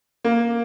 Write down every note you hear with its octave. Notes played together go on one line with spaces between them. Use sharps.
A#3